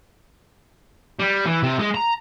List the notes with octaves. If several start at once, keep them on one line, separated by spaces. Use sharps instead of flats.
G3
E3
C3
G#3
A#5